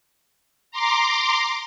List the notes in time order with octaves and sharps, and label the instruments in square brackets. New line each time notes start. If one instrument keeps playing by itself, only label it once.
[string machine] A#5 C6 D6